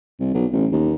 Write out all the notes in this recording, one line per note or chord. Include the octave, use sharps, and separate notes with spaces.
C2
B1
A1
D#2